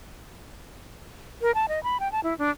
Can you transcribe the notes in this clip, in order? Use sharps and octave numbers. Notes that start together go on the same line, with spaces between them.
A#4
A5
D#5
B5
G5
A5
E4
D4